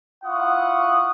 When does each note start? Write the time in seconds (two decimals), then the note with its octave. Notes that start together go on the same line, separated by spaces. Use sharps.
0.24 E4 F4 F#5 C#6 D#6